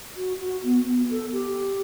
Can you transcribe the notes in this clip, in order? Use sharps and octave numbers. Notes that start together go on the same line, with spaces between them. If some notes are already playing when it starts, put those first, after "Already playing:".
F#4
F#4
B3
B3
A4
G4